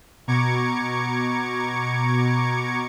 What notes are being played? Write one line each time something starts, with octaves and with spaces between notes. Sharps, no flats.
B2 A#5 C#6 D6 G#6 C#7